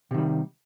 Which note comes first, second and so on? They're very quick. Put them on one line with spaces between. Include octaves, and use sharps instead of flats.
C3 D#3 G3